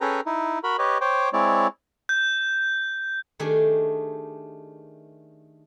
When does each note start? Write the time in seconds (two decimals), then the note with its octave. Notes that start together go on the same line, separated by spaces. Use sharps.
0.01 C#4 G#4 A4 B4 G5 A#5
0.26 D#4 E4
0.64 F#4 A#4 B5
0.79 G4 B4 C#5 D#5
1.01 C5 C#5 G5 D6
1.33 G#3 C4 E4 C#5 D5
2.09 G6
3.40 D#3 A3 D4 G4 G#4